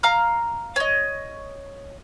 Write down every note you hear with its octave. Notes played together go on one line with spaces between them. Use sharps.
F5 A#5 F6
C#5 D#5